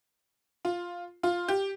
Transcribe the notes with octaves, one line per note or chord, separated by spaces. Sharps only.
F4
F4
G4